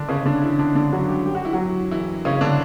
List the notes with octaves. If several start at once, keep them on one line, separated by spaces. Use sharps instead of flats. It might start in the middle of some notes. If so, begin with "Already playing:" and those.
Already playing: D3 D4
C#3 C#4
D3 D4
E3 E4
D3 D4
D3 D4
F#3 F#4
G3 G4
G4
F#4
E4
F#3 F#4
E3 E4
C#3 C#4
D3 D4